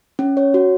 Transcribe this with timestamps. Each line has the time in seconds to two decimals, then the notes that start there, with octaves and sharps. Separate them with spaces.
0.19 C#4
0.37 C#5
0.54 F#4